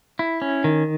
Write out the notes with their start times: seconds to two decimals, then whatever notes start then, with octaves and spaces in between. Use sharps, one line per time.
0.19 E4
0.42 C#4
0.64 D#3